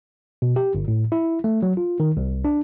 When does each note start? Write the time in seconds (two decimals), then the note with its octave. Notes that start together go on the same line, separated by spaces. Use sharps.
0.42 B2
0.56 G4
0.75 G1
0.88 A2
1.12 E4
1.44 A3
1.63 F#3
1.77 F4
2.00 D#3
2.17 C2
2.45 D4